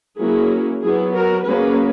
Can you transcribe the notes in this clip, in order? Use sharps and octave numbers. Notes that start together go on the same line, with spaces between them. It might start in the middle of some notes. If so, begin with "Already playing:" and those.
F#3 A#3 C#4 E4 G#4
F#3 B3 E4 G#4
F#4 A#4
F#3 A#3 C#4 G#4 B4